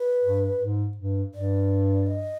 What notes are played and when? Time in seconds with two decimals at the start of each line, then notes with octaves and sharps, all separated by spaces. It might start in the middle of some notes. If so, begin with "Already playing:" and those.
Already playing: B4
0.23 G2
0.60 G#2
0.97 G2
1.33 G2 D5
2.07 D#5